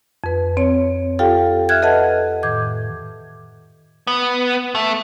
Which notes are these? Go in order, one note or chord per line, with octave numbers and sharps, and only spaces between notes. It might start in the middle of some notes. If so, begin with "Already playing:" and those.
F2 B4
C4 C#5
F4 G4 A4 F5 G5
E5 F6 F#6 G#6
A4 B4 D#5 E5 F#5 A5
A2 D#3 D6 G6 G#6
B3
A3